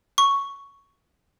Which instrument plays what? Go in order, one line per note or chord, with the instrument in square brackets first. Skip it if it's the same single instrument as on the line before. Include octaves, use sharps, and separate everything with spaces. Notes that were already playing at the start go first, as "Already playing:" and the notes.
[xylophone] C#6